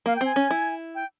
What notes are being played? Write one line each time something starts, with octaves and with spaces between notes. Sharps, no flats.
A#3 F5
G5
C4 G#5
C#4
E4
G5